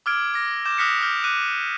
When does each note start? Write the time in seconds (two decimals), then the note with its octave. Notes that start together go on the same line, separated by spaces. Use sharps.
0.06 D6 E6 F6 G#6 D7
0.34 D6 A#6
0.65 D6 G6 E7
0.78 D#6 F6 F#6 A#6 B6 C#7
1.01 D6 F6 G6
1.24 D6 F#6 D#7